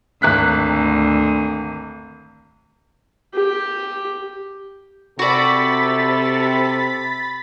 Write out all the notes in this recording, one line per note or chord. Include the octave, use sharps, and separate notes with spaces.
G#1 D2 F#6 B6
G4
C3 F#4 A4 D5 B5 A6 B6